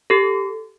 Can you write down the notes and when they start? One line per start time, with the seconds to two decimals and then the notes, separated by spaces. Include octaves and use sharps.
0.10 G4 A4